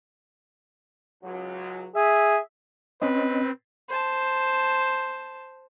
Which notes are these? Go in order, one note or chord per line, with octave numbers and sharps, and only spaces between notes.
C#2 F#3
G#4 E5
C4 C#4 B4 D#5
C5 A5